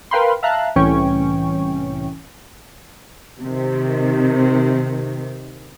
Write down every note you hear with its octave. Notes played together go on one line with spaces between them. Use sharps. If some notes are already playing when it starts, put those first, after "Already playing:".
A#4 B4 F5 G5 B5 C6
E5 F5 A5 A#5 F#6
C2 A2 E3 C#4 G5 C#6
C3 D#3